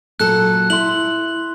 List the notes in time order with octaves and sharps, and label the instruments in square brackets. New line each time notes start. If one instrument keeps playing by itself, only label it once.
[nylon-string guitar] A#2 F#3 A4 [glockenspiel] F#6
[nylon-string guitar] E4 [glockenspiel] C6 F#7